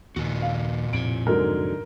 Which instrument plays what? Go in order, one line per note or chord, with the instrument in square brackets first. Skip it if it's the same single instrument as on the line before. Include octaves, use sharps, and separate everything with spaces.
[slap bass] D#2 [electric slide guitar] A#2 F#4
[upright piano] F5
[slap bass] F2 A2 C3 [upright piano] D7
[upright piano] G#2 D3 F#3 [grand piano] A#4